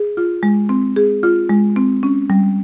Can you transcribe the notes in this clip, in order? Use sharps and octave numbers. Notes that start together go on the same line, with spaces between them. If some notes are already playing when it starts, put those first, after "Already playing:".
Already playing: G#4
F4
G#3
C4
G#4
F4
G#3
C4
C#4
G3